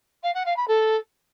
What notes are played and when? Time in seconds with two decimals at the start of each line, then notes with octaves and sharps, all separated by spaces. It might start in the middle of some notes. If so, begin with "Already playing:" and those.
0.23 F5
0.34 F#5
0.45 F5
0.57 B5
0.68 A4